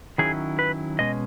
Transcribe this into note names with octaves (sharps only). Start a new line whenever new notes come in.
D#3 F#3 C#4 E4 G#4
B4
B2 G#3 C#4 D#5